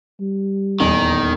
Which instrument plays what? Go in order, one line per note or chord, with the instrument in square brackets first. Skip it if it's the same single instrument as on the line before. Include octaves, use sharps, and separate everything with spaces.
[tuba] G3
[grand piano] D#1 E2 D#5 [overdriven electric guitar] D#3